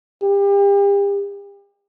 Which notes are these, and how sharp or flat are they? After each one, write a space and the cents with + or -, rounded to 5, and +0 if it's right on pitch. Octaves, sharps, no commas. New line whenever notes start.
G4 +35